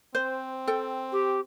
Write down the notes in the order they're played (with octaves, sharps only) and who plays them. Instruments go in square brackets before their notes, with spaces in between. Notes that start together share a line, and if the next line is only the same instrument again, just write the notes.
[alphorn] C4 [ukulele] C5
[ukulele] A4 G5
[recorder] G4